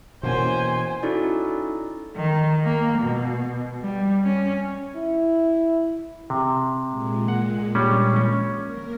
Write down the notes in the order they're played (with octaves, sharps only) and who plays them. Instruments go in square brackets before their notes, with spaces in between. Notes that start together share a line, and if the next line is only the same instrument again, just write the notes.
[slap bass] B2 E3 [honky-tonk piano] A#3 C#4 [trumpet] C5 [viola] G5 G#5
[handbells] C#4 D#4 E4 F#4 A4 D5
[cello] D#3
A#3
B2
G3
C#4
[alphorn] E4
[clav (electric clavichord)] C3
[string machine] A#2 G#3
[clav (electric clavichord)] F#5
G3 C#4 D4
C#4
[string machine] A#3 A#4